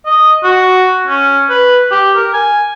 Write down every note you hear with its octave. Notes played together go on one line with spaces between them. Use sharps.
D#5
F#4
C#4
B4
G4
A#4
G#5